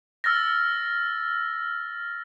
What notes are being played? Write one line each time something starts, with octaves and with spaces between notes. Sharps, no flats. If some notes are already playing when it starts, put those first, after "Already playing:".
E6 F6 A6 A#6